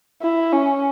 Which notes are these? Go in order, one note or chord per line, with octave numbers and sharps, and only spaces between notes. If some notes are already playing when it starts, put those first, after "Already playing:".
E4
C#4